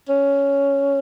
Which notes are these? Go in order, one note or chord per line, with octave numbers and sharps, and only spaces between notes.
C#4